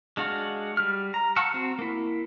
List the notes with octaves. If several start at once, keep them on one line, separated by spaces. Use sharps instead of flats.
G#3 D4 F#4 F5
G3 F6
A#5
F5 F#5 A5 C#6 E6
C4 F#4
A#3 E4